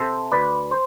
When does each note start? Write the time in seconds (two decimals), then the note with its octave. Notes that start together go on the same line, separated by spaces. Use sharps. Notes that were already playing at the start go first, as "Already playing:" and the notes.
Already playing: C3 A4 C5
0.32 D2 B4 D5
0.71 C5